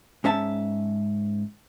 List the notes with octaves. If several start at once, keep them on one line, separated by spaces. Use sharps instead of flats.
G#2 C#4 E5 A5